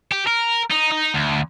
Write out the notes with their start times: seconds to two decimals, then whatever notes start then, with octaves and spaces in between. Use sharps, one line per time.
0.12 G4
0.27 A#4
0.70 D#4
0.91 D#4
1.14 D2